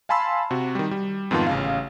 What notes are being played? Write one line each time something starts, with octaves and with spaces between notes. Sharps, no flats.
F5 G#5 A5 B5 C6 E6
C3 F#4
D#3 G3
G3
F2 G#2 D#3 B3 F4 A5
A1 C#3 F5